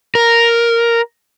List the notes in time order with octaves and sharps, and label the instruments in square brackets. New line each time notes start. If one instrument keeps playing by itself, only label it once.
[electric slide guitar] A#4